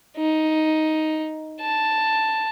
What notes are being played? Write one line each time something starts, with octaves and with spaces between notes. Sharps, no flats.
D#4
A5